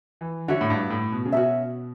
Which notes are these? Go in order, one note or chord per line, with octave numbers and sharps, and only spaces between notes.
E3
D3 F#4 C#5 E5
A2
G2
A2
B2
C#3
B2 C#4 F#4 A4 E5